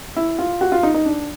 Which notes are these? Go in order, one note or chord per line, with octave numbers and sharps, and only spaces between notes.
E4
F4
F#4
F4
D#4
D#4
D4